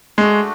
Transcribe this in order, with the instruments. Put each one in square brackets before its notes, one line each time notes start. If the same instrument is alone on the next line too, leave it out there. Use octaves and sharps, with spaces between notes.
[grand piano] G#3 [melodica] A3 D4 F#4